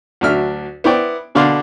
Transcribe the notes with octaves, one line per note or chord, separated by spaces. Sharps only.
D2 F#3 D4 E5 F6
B3 E4 C5 D5 G5
B2 D3 D5 F5 C6 D6